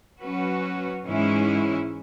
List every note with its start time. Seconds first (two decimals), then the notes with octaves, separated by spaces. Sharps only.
0.22 F#3 C#4 F#4 B4
1.05 G#2 E3 G#3 C#4 E4